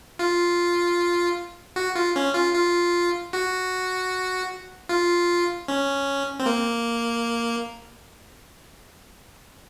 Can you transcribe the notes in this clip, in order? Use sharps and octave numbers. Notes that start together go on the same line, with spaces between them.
F4
F#4
F4
C#4
F4
F4
F#4
F4
C#4
C4
A#3